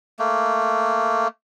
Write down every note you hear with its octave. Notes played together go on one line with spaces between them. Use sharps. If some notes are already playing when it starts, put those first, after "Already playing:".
A3 A#3